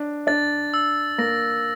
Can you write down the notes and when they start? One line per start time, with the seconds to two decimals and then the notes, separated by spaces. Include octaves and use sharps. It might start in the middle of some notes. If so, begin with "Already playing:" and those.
Already playing: D4
0.27 D4 A6
0.74 E6
1.18 A#3 A#6